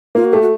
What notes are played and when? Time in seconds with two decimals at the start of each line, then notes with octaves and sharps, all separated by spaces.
0.15 A#3 F4
0.25 F#4
0.33 A3 G4
0.42 F#4